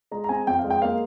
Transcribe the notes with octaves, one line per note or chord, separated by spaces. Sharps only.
G#3 A#5
A#5
C4 G#5
F2 G5
F5
G#3
G5
A#3 F5